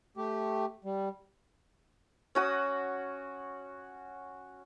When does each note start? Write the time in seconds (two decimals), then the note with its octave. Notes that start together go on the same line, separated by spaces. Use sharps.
0.17 A3 G4
0.84 G3
2.35 C#4 F#4 D#6